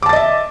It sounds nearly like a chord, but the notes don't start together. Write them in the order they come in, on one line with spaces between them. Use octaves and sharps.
D6 A5 A6 D#5 E5